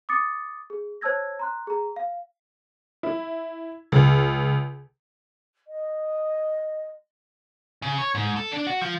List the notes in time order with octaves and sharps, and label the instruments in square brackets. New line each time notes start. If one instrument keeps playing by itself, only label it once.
[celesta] D6 D#6 A6 C#7
G#4
C5 C#5 A5 E6 G#6 A#6
A#5 C6 F#6
G#4 A#5
F5
[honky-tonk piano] E4
C#2
[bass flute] D#5
[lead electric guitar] C#3
C#5
G#2
A4
D4
F#4
F3